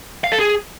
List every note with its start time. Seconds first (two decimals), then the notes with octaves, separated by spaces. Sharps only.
0.24 F5
0.32 A4
0.39 G#4